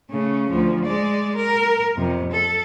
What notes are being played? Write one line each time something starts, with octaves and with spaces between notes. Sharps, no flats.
C#3 A3
D2 F3
G#3 D5
A#4
F2 C3
A4